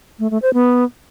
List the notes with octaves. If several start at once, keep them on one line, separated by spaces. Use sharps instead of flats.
A3
A3
C5
B3